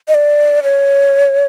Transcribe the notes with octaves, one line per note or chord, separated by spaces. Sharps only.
D#5
D5
C#5